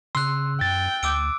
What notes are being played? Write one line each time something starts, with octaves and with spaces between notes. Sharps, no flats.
C#3 C6 E6 F#6
F#2 G5 A6
D2 D6 E6 D7